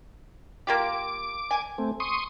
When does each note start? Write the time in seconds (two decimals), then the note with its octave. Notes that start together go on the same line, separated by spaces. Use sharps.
0.67 A#3 F4 G4 D6
1.51 G#5
1.78 A3 C4
2.00 C6 C#6 D#6